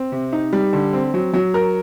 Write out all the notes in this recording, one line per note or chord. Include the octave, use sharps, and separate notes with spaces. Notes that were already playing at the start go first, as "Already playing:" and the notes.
Already playing: C4
C3
D#4
G3
D3
C4
F#3
F#3
A#4